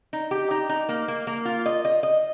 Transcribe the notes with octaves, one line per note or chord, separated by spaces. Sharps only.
D#4
G4
D#4
D#4
A#3
A#3
A#3
F4
D#5
D#5
D#5